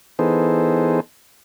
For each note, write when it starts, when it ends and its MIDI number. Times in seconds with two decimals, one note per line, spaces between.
0.19 1.00 52
0.19 1.00 59
0.19 1.00 63
0.19 1.00 68
0.19 1.00 69
0.19 1.00 72